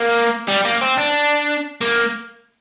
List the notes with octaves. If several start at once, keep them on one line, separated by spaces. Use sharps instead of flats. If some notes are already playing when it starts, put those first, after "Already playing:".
Already playing: A#3
G3
A#3
C4
D4
A#3